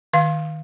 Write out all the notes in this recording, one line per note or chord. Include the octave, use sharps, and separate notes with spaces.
D#3 F5